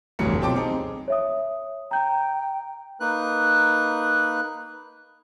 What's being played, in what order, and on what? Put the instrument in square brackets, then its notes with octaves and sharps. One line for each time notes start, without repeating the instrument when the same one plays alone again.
[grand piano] F1 D2 G2 E3 F#3 C#7
B1 F3 C4 G5 A5 D6
C4 D#4 G#4
[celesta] C#5 E5 D#6
[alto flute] G5 [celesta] A#5 G6
[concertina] A#3 D#4 B4 F#6